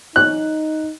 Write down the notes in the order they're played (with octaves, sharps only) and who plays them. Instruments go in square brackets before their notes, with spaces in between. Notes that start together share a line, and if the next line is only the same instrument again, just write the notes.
[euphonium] D#4 [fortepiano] F#6